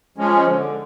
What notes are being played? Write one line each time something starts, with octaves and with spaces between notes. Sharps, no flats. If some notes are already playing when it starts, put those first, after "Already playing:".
F3 G#3 C#4
D3